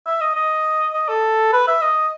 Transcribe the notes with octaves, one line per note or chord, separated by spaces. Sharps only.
E5
D#5
D#5
D#5
A4
B4
E5
D#5